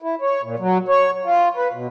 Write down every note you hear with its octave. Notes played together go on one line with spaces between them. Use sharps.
E4
C#5
A#2
F#3
C#5
F4
B4
B2